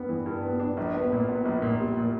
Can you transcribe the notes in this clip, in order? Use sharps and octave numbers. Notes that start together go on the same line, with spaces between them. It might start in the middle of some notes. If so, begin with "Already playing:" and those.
Already playing: G2 B3 D4
E3
G2
B3
D4
A#1
B3
A#2
B3
A#1
A#2
G3
A#2